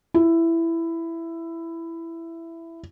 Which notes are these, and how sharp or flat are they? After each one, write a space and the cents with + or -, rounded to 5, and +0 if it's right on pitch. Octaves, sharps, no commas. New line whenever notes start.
E4 +10